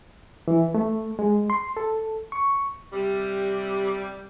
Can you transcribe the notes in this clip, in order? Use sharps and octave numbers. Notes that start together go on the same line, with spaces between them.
E3
A3
G#3
C6
A4
C#6
C3 G3